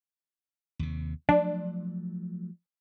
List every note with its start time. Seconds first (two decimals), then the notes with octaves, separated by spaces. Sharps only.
0.79 D#2 C3
1.29 F3 F#3 A3 D4